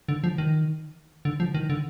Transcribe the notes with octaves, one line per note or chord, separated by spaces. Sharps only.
D3
F3
D#3
D3
F3
D#3
D3